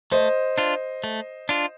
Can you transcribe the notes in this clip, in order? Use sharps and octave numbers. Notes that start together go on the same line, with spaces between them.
A3 C5 D#5
D4 F4
A3
D4 F4